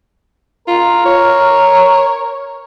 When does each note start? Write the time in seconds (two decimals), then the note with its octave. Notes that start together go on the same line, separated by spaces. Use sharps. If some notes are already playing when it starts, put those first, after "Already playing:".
0.68 F4 A#4
1.05 C#5